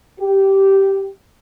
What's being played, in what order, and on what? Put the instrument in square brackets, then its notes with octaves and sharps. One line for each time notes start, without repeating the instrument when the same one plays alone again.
[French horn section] G4